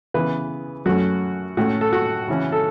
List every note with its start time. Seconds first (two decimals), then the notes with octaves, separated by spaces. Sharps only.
0.14 C#3 E3 B3 B4
0.85 F#2 F#3 A3 C#4 F#4
1.57 A2 A3 C#4 F#4
1.81 A4
1.93 F#4
2.28 C#3 E3 C#4
2.52 A4